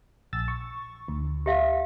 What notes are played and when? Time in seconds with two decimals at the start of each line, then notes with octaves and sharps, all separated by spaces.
0.33 A#1 E6 A6
0.48 C#6
1.08 D2
1.46 G4 E5 F5